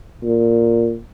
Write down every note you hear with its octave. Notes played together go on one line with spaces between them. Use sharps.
A#2